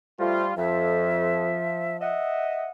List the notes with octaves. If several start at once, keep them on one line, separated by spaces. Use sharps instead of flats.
F3 G3 A3 F4
F2 F3 E5
D#5 E5 F#5